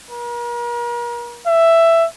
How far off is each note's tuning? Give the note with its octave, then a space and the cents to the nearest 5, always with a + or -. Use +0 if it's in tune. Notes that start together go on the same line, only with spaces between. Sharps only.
A#4 +40
E5 +10